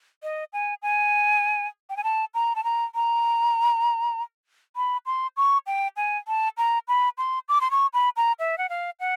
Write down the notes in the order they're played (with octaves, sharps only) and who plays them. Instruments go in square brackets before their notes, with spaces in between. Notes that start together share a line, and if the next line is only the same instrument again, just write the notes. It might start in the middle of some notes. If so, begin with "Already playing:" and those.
[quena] D#5
G#5
G#5
G5
G#5
A5
A#5
A5
A#5
A#5
B5
C6
C#6
G5
G#5
A5
A#5
B5
C6
D6
C6
C#6
B5
A#5
E5
F#5
F5
F#5